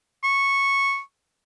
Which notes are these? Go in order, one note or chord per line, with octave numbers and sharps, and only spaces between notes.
C#6